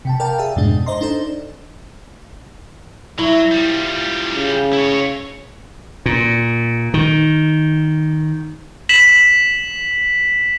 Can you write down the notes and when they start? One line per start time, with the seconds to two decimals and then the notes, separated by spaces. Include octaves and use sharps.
0.05 C3 G5 A5
0.20 A#4 D5 F5 G5 A5
0.38 G#4 E5 A5
0.56 F2 G#2 B2 G#3 D4
0.86 C5 D5 D#5 A#5 C6
1.01 D4 D#4 A4 C5
3.19 F#3 E4
3.51 F3 G3
4.35 C#3
4.73 E4 C#5
6.06 A#2
6.94 D#3
8.89 B6 E7 F#7